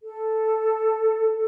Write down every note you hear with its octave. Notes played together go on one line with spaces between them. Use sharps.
A4